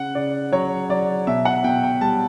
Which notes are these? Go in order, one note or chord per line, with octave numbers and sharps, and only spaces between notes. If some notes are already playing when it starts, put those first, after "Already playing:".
Already playing: C#3 F#5
C#3 D5
F#3 C#5
F#3 D5
B2 E5
F#5
B2 G5
G5
G3 A5